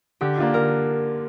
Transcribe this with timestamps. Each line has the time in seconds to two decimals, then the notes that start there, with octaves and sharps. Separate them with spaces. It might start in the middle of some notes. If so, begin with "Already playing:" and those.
0.21 D3 G4
0.38 A#3 D4 F4
0.54 D3 A#4